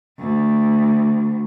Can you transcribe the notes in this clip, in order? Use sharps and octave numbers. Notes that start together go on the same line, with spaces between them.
D2